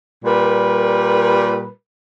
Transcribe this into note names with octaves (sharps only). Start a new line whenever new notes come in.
A#2 G3 A#4 B4